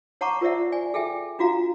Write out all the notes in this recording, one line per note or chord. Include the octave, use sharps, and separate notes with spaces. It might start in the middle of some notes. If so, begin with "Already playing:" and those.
C#5 F#5 A5 A#5 C#6 D6
F4 A#4 C5 D5 E5 F#5
D5 G#5
G#4 A4 E5 G5 G#5
D4 F4 F#4 F5 A#5